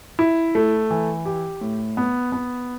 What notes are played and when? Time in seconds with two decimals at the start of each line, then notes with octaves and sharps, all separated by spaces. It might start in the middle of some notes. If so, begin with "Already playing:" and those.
0.19 E4
0.55 A3
0.91 E3
1.26 G4
1.61 A2
1.97 B3
2.32 B3